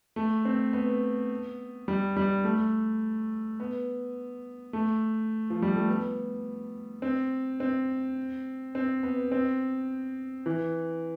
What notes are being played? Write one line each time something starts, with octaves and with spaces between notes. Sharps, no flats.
A3
C4
B3
G3
G3
A3
B3
A3
F3
G3
A3
B3
C4
C4
C4
B3
C4
E3